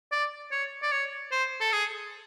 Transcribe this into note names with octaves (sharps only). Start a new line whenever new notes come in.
D5
C#5
D5
C#5
C5
A4
G#4